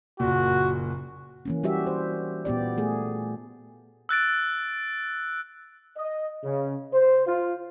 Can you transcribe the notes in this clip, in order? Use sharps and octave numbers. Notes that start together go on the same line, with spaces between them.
F#1 A#2 F#4
E3 A#3 C#4
G3 F#4 G4 E5
C5
A#2 B3 G4 D5
A3 G#4
E6 F#6 A6 D7
D#5
C#3
C5
F4